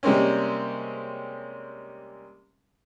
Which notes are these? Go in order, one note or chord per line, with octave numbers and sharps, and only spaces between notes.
C3 G3 G#3 A#3 C4 C#4